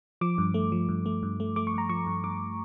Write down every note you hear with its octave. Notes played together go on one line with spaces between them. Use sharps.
F3 D6
G2
A3
F3
G2
A3
G2
A3
A3 D6
C#6
G2 A#5
F3 C#6
G2
G2 D6